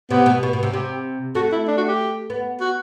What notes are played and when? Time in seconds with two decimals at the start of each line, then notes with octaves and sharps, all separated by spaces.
0.10 C3 B3
0.26 B2
0.43 B2
0.53 B2
0.63 C3
0.74 C3 G4
1.35 A3 F#4
1.52 E4
1.67 D4
1.77 F#4
1.88 G4
2.30 B3
2.60 F#4